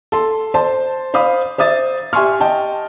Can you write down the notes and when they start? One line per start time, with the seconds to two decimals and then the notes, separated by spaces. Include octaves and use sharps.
0.12 A4 C6
0.54 C5 A5 C6
1.14 C5 F5 B5 D#6
1.58 C5 E5 D#6 A6
2.13 G4 E5 G#5 C6 C#6 F6
2.40 D#5 G5 A5